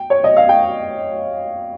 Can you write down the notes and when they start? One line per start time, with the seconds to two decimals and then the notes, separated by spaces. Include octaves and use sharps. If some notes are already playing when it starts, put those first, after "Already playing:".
Already playing: G5
0.10 C#5
0.24 D#5
0.37 F5
0.49 G5